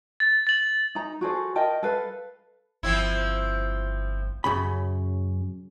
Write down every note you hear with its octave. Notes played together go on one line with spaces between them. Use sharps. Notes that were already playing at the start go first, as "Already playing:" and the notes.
A6
A6 F#7
D#4 A#5
F#4 G#4 A4 C5
A#4 D#5 G5 A5
A4 B4 F5
G1 F3 C4 E4
F#2 C#3 B5